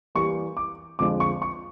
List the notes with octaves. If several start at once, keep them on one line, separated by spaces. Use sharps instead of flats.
E3 G3 A#3 C#6
D6
F2 D3 F3 G#3 D6
C#6
C#6